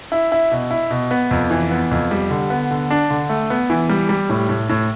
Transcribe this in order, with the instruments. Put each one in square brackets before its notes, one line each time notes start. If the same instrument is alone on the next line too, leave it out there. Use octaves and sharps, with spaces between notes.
[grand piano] E4
E4
B2
E4
B2
B3
F2
E3
B3
F2
G3
D3
B3
D3
D4
D3
A3
B3
E3
G3
G3
A2
A2
A2